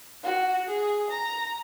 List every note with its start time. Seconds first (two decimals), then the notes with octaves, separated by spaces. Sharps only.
0.23 F#4
0.69 G#4
1.10 A#5